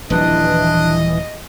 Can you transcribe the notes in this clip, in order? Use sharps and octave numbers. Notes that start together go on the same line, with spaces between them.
D#1 E3 F3 G3 D4 D#5